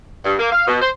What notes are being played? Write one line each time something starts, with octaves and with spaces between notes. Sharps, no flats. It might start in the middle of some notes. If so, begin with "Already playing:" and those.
G2
A#3
F5
B2
C5